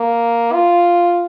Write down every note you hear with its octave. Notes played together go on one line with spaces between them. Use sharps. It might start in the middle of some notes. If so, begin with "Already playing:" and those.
Already playing: A#3
F4